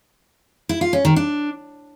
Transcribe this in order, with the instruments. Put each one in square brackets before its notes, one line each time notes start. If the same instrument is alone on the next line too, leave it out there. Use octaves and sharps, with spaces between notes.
[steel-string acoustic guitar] E4
F4
C#4
D#3
D4